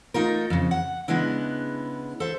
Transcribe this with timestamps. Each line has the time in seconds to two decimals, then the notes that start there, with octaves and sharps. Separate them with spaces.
0.14 A3 D#4 F4 A#4
0.50 F2 C#3
0.71 F#5
1.08 C#3 G#3 B3 D4 E4
2.20 A4 C5 E5